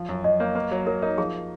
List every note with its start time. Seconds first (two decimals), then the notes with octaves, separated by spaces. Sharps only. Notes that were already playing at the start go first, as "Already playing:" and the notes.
Already playing: F3
0.09 F#2
0.24 F#2 D#5
0.40 A#3 C#5
0.55 A#3 B4
0.71 F#3
0.87 F#3 A#4
1.02 D#4 A#4
1.18 F3 G#4